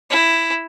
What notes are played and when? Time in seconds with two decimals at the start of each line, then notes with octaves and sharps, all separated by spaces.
0.10 E4